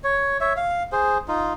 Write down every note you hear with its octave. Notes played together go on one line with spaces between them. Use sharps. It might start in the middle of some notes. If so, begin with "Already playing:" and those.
C#5
C#5 E5
F5
G#4 C5
D#4 F4